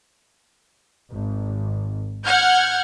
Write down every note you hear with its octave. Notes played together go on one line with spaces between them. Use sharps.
G#1
F#5 F6 G6 G#6